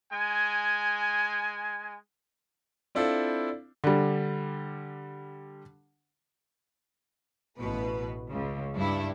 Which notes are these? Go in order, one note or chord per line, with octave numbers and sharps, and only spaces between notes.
G#3 G#5
C4 D4 E4 F4 A4 C5
D3 G3
A1 B2 B4
C#2 C#3
G2 D4 E4